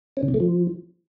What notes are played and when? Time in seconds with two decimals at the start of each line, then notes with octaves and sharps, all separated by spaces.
0.17 C#4
0.23 C#3
0.28 C3
0.34 A3
0.40 F3